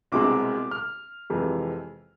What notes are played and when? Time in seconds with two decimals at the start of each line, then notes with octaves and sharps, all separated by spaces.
0.12 C2 B2 G#3 C4 D6
0.71 F6
1.30 F2 C3 E3 G#3